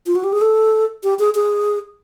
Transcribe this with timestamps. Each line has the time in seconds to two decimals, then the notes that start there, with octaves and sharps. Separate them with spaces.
0.06 F4
0.15 F#4
0.24 G4
0.33 G#4
0.41 A4
1.03 G4
1.19 G#4
1.35 G#4